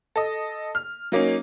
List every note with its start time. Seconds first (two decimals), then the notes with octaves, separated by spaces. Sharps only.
0.16 A4 D#5
0.75 F6
1.12 F#3 A#3 C#4 D#4